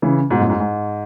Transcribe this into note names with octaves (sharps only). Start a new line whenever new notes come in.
C#3 E3
G#2 B2
F#2 A2
G#2
G#2